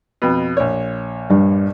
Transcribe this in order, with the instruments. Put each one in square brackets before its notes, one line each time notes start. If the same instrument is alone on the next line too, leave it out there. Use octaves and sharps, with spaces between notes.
[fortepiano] F2 B2
A#1 C#5
[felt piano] G2